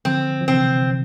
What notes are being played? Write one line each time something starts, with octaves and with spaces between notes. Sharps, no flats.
D3 F3 C4
F3
C3 E3 C4